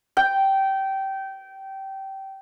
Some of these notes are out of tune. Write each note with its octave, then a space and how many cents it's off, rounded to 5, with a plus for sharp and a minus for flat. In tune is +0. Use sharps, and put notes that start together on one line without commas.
G5 -20